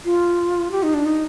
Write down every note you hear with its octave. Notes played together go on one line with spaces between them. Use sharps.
F4
G4
D#4
D4
D#4